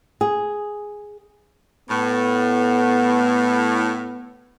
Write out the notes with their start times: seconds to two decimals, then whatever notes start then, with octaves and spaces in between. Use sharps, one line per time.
0.21 G#4
1.90 A2 B3